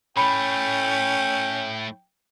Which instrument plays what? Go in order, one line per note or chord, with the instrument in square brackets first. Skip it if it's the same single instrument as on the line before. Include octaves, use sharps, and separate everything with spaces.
[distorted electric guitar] A2 A3 [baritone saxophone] C#4 [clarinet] G5 [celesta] B5